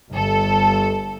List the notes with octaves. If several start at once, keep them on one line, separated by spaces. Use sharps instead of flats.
G1 A4